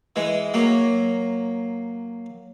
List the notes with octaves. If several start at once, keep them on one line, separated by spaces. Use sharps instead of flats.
E3 G#3
F#3 A#3